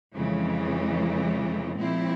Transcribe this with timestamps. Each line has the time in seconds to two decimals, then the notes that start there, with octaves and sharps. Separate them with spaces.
0.14 F2 C#3 E3 G#3
1.79 A#2 F3 G#3 C4 E4